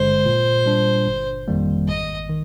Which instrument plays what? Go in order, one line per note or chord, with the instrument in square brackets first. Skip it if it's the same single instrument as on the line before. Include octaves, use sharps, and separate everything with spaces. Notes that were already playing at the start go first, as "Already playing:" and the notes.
Already playing: [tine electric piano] G#1 G2 D3 G#3 [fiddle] C5
[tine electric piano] A#2
G3 D4
G1
F2 D#3 G3 A#3
[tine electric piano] G#1 [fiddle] D#5
[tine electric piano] D#3